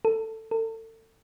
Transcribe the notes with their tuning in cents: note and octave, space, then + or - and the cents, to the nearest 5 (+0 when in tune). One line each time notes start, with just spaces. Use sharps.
A4 +15
A4 +35